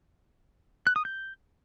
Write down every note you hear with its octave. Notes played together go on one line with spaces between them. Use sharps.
F#6
D#6
G6